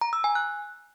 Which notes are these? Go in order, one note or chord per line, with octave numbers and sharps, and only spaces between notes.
A#5
E6
G#5
F#6